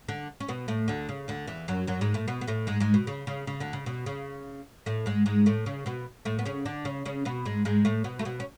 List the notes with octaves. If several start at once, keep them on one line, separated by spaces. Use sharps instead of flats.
D3 D4
C#4
B2 B3
A2 A3
D2 D3
C#3
D2 D3
E2 E3
F#2 F#3
F#2 F#3
G#2 G#3
A2 A3
B2 B3
B3
A2 A3
G#2 G#3
G#2 G#3
B2
C#3
C#3
C#3
D2 D3
C#3
B2
C#3
A2 A3
G#2 G#3
G#2 G#3
A2 A3
C#3 C#4
B2 B3
A2 A3
B3
C#3 C#4
D3 D4
C#3 C#4
C#3 C#4
B2 B3
G#2 G#3
G#2 G#3
A2 A3
B2 B3
A3
B2 B3
C#4